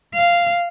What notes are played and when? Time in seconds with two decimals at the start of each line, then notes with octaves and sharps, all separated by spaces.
0.15 F5